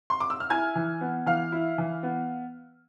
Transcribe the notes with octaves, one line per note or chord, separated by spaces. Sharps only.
C6
D6
E6
F6
E4 G#5 G#6
E3
B3
E3 F5 F6
E4
E3
B3